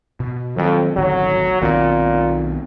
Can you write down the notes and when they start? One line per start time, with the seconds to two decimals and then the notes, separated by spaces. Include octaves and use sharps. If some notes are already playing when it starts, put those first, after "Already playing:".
0.20 B2
0.57 F2 D#3 F#3 C4
0.96 D#1 G#1 D3 F#3
1.62 B1 A#2 D#3 C4